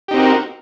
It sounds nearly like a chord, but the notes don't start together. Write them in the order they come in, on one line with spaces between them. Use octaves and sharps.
G4 D#4 C4 F#4 A#4